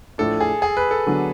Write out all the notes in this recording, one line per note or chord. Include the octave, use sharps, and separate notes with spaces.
A2 F3 A3 D4 A4
G#4
G#4
B4
A4
D3 F#3 B3 D4